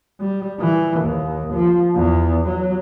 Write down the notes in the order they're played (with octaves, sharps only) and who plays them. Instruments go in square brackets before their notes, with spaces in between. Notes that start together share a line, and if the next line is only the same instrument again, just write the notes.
[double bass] G3
E3
D#2
F3
E2
F#3